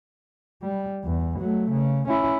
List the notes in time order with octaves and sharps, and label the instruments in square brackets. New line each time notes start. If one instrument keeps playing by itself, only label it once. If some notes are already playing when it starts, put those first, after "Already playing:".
[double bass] G3
E2
F#3 A3
C#3
C#4 E4